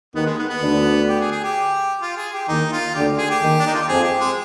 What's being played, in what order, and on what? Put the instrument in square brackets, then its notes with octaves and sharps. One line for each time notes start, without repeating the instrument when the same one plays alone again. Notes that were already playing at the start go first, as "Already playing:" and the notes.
[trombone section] D#2 D#3 [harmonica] B3
[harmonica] G#3
B3
B3
[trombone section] D2 D3
[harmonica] G4
G#4
G#4
G4
F4
G#4
G4
[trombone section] D#2 D#3 [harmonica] D#4
[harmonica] F4
[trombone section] D2 D3 [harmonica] G4
[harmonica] G#4
G4
[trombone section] D#2 D#3
[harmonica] D4
D#4
F4
G4
[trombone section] F2 F3 [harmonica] G#4
[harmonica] G4
G#3